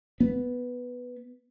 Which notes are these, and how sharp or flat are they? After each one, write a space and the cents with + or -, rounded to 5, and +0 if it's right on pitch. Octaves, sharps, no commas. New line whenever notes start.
B3 +0